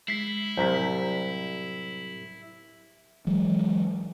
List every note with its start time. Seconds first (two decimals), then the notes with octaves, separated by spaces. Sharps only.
0.08 G#3 E4 B6 C7
0.57 C2 A2 F#3 C5 A#5 B6
3.27 E3 F#3 G#3